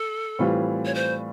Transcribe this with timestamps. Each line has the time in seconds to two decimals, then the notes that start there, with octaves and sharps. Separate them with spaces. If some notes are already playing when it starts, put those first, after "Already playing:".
Already playing: A4
0.39 A2 E3 G3 C4 F4
0.85 C#5
0.95 C5